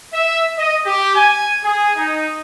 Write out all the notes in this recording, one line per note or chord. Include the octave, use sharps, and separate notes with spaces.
E5
D#5
G4
G#5
G#4
D#4